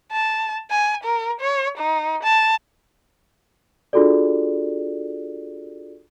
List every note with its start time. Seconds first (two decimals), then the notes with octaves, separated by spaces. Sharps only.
0.12 A5
0.71 G#5
1.04 A#4
1.41 C#5
1.78 D#4
2.23 A5
3.93 D4 F4 F#4 G#4 A4 D5